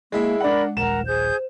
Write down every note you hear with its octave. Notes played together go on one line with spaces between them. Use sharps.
G#3 A#3 E4 E5
G#3 D4 A#4 D5 F#5 B5
D#1 A#1 A#4 F#5 A#5 E7
G#4 C5 G6